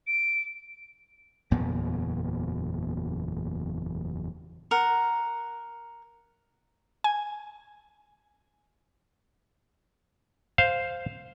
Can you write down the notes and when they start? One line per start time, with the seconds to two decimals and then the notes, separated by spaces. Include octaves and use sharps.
0.07 D7
1.51 F#1 E2 A#2 B3
4.71 A#4 F#5
7.04 G#5
10.58 C5 F5